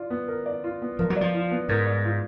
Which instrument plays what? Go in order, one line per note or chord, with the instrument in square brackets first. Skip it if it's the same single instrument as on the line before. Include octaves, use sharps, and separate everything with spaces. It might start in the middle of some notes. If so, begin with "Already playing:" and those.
Already playing: [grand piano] F4 D5
B3
A#4
D5
F4
B3
[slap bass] F3 [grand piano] A#4
[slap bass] F#3
[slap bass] F3 [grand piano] D5
[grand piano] F4
B3
[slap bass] G#2 [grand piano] A#4
[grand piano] D5
F4